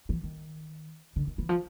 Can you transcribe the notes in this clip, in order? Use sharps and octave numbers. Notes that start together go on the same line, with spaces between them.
E3
D#3
D3
D#3
E3
F3